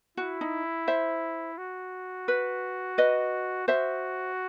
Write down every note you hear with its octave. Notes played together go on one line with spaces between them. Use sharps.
E4 F#4
D#4
C5 E5
F#4
B4
B4 D#5
F#4 C5 E5